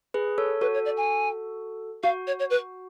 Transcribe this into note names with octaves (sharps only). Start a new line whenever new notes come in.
G#4 B4
A4 C#5
F#4 A4 B4
C#5
D5
G#5
F#4 F5
C#5
C#5
B4